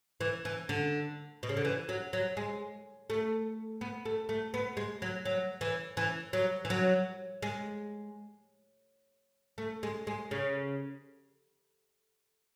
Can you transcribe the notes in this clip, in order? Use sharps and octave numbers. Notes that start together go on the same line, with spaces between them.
E3
E3
D3
B2
C#3
D3
E3
F#3
F#3
G#3
A3
B3
A3
A3
B3
G#3
F#3
F#3
E3
E3
F#3
E3
F#3
G#3
A3
G#3
G#3
C#3